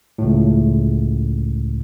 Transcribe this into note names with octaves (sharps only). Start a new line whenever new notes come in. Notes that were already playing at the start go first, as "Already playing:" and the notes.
C#2 A2